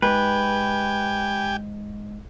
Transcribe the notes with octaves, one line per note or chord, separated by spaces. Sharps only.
G#2 G4 B4 G5 G#5